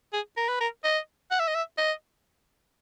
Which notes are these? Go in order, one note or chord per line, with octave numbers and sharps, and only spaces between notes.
G#4
A#4
B4
A#4
D#5
F#5
E5
D#5
E5
D#5